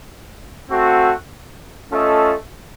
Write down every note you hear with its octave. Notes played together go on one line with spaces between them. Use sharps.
A3 C4 F#4
A3 C#4 F4 A4 D#5